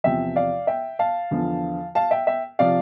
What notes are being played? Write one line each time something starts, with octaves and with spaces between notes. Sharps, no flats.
E2 C3 F3 E5 G5
D5 F5
E5 G5
F5 A5
E2 D3 F3
F5 A5
E5 G5
E5 G5
C3 F3 D5 F5